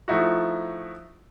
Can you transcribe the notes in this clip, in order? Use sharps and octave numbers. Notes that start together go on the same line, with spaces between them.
F3 A3 D#4 E4 F#4